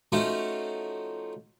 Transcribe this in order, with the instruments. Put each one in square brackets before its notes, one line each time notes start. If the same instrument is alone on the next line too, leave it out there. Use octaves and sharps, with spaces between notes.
[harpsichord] F3 A3 C#4 D#4 F4 F#4